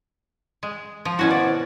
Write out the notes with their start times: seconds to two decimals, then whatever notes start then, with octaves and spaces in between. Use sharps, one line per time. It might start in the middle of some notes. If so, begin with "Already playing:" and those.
0.63 G#3
1.05 F3
1.19 B2 C#4 E4 F#4
1.31 D#3 C5 D5 F#5